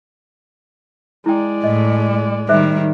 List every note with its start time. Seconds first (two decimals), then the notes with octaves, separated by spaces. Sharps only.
1.26 G#3 E4 D5 G5
1.64 A2 D#5
2.49 D#3 G3 G#4 C5 E5